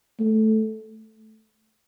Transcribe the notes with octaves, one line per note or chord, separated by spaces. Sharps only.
A3